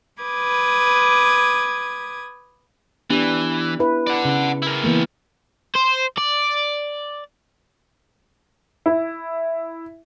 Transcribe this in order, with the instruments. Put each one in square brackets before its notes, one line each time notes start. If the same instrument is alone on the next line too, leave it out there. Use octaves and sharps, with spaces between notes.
[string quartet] B4 D6 D#6 G#6
[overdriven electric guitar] E3 [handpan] B3 D4 G4
[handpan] E4 B4
[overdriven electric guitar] D5 F#5
[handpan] C#3
[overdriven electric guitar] E4 A#4
[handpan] E3 A#3 B3
[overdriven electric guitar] C5
D5
[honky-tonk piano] E4